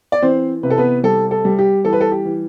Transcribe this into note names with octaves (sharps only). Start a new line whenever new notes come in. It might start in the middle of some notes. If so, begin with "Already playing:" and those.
D5
E3 C4 C5
C3 B4
A4
B3 B4
G3 A4
A4
G3
G4
E3 A4
B4
A4
G4
E3